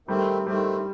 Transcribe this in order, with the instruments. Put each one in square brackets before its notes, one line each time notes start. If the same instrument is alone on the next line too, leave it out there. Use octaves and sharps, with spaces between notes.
[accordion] D#3 A3 C4 [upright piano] G3
[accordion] D#3 A3 C4 [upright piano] G3